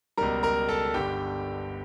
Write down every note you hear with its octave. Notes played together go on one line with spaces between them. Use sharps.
C#2 B2 G3 A#4 A#5
A#4 A#5
A4 A5
G1 G2 D3 G4 G5